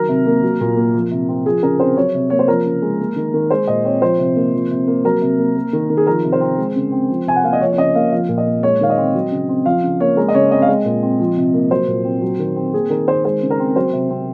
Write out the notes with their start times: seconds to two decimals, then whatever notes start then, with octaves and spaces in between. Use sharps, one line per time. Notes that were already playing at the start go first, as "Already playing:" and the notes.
Already playing: D#3 F#3 A#4
0.09 C3
0.26 A#3
0.43 F#3
0.61 A#2
0.77 A#3
0.94 F3
1.11 C3
1.29 C4
1.46 F3 G#4
1.63 C#3 A#4
1.80 C4 C5
1.97 F#3 C#5
2.15 C3
2.30 A#3 C#5
2.39 C5
2.48 F3 A#4
2.66 C#3
2.82 G#3
2.99 A#3
3.16 D#3
3.34 D#3
3.51 G#3 C5
3.68 A#2 D#5
3.84 C4 C#5
4.02 F3 C5
4.19 C3
4.36 A#3
4.53 F3
4.71 C3
4.87 A#3
5.04 F#3 A#4
5.22 C3
5.38 A#3
5.56 A#3
5.73 D#3
5.90 D#3
5.97 G#4
6.07 F3 A#4
6.24 C3
6.33 C5
6.41 C4
6.58 G#3
6.76 C#3
6.92 C4
7.10 F3
7.27 C3 G#5
7.36 F#5
7.44 A#3 F5
7.53 D#5
7.61 F3 C#5
7.73 C#5
7.78 C#3 D#5
7.95 A#3 F5
8.12 F3 F5
8.29 A#2
8.38 D#5
8.46 A#3
8.63 G#3 C#5
8.81 D#3 F5
8.90 D#5
8.97 C4
9.14 F#3
9.32 C#3
9.49 C4
9.65 F3 F5
9.83 C#3
10.00 A#3 C#5
10.17 G#3 A#4
10.28 D#5
10.34 C#3 C#5
10.51 C4 D#5
10.62 F5
10.68 G#3 D#5
10.85 A#2
11.03 C4
11.20 F3
11.37 C3
11.54 A#3
11.71 F#3 C5
11.88 A#2
12.05 C4
12.22 F#3
12.39 D#3
12.56 C4
12.73 A#3 G#4
12.90 D#3 A#4
13.08 D#3 C5
13.24 G#3 C5
13.42 C#3
13.50 A#4
13.60 C4
13.76 F#3 C5
13.93 C3
14.10 C4